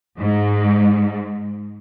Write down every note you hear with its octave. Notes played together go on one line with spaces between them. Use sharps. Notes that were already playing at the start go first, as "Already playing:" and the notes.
G#2